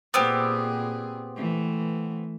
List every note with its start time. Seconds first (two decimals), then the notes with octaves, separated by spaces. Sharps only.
0.14 A#2 B3 C4 G4 G#4
1.36 E3 A3